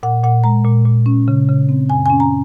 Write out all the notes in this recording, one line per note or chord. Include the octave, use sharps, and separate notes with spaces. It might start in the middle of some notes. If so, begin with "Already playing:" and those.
A#2 F#5
A#2 F#5
G#3 A#5
A#2
A#2
C#4
C#3
C#3
C4
F#2 G#5
C#4 G#5
A#5